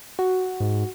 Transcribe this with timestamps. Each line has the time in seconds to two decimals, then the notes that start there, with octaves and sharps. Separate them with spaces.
0.19 F#4
0.60 G#2